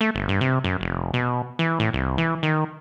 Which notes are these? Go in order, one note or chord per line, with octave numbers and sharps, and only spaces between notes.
A3
G1
G2
C3
F#2
F1
B2
E3
A2
C2
E3
D#3